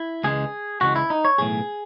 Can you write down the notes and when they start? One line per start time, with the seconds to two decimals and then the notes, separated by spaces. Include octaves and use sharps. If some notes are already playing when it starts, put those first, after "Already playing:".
Already playing: E4
0.24 C#2 C#3 E3 G#3 G#4
0.81 C#2 C#3 E3 G#3 F#4
0.96 E4
1.10 D#4
1.25 C#5
1.38 B1 A2 E3 G#4